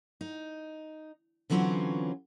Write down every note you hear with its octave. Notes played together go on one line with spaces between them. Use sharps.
D#4
D3 E3 F#3 C4 C#4 F4